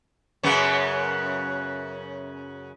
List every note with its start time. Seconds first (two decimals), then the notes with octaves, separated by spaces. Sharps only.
0.43 F#2 C#3 B3